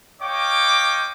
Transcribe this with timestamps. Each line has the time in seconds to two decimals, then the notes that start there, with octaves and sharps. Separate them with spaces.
0.22 C#5 D#5 F5 G5 D6